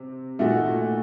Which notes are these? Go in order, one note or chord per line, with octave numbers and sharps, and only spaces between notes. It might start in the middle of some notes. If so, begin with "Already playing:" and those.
Already playing: C3 C4
A#2 A3 D#4 F#4